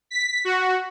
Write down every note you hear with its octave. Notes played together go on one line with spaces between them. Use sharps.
B6
F#4